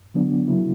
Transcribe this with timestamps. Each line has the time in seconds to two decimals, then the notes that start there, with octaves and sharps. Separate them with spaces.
0.14 D3 F#3 B3 D4
0.48 C#3 F#3 A#3 E4